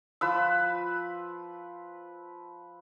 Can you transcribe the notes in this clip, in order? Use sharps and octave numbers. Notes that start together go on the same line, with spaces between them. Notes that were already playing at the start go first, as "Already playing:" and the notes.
F3 B4 E6